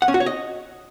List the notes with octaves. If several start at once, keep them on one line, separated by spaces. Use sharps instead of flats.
F#5
C#4
F#4
C#5
D#5